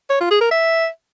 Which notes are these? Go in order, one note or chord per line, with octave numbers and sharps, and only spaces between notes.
C#5
F4
G#4
A#4
E5